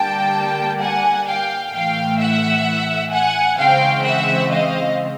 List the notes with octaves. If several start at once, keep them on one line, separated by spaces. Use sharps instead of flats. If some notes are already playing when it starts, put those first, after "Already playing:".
Already playing: D3 G3 A#3 G5 A5
F#5 G#5
F5 G5
A2 E3 A3 F5 G5
E5 F#5
F#5 G#5
C#3 E3 G#3 C4 F5 G5
E5 F#5
D#5 F5